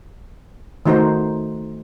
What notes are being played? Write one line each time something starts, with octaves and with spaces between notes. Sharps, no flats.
D#3 A3 D#4 F#4 C5